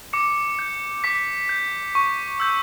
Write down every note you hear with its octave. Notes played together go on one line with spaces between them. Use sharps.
D6 C#7
G6
D6 B6
G6
C#6
E6 G6